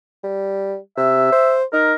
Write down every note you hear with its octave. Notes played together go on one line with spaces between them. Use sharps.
G3
C3 E5
C5
D#4 A#4